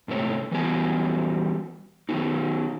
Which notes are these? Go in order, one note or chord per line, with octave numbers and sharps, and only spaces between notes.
G#2 C3 A3 C#5
E3 F#3 G3 B3 D#5 G#5
D#3 F3 F#3 B3 D#4